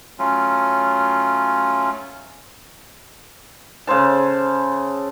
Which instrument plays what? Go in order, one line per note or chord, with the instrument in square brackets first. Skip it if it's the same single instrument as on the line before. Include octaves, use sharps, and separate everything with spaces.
[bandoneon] F#3 A3 C#4 F4
[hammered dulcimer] C#3 A4 C5 A5